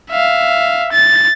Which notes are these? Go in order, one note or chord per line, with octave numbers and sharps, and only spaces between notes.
E5 F5
A6